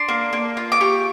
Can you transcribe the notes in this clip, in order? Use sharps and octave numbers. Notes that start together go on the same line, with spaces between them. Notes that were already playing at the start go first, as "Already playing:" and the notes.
Already playing: D4 C6
A#3
A#3
F4
D6
G4 C#6